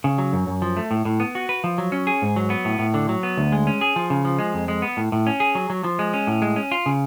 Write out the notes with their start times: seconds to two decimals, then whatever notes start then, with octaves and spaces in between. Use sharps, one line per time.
0.04 C#3
0.18 F#3
0.33 F#2
0.47 F#2
0.62 F3
0.77 A3
0.91 A2
1.05 A2
1.20 B3
1.35 F#4
1.49 B4
1.64 F3
1.78 F#3
1.92 C#4
2.07 G#4
2.22 G#2
2.36 F#3
2.50 B3
2.65 A2
2.79 A2
2.94 D3
3.09 F#3
3.23 B3
3.37 D2
3.52 G#3
3.67 C#4
3.81 G#4
3.96 F3
4.10 C#3
4.25 F3
4.39 G#3
4.54 F2
4.68 G#3
4.82 B3
4.97 A2
5.12 A2
5.27 C#4
5.40 G#4
5.55 F#3
5.70 F#3
5.84 F3
5.99 G#3
6.14 C#4
6.27 A2
6.42 G#3
6.56 C#4
6.72 F4
6.86 C#3